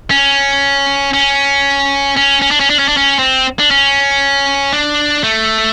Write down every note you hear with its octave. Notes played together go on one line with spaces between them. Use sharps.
C#4
C#4
C#4
C#4
D4
C#4
D4
C#4
D4
C#4
C4
D4
C#4
D4
A3